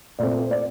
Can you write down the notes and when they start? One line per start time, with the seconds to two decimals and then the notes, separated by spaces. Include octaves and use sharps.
0.19 A#2 A3 C4 D5
0.39 C5
0.51 D5